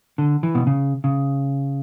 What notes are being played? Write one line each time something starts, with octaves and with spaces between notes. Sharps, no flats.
D3
E3
B2
C#3
C#3